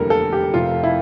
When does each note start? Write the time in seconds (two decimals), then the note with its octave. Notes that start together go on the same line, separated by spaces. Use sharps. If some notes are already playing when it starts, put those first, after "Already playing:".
Already playing: F1 E2 D3 G3 A#3 A4 A#4
0.10 A4
0.32 G4
0.54 F1 F2 C3 F4
0.83 E4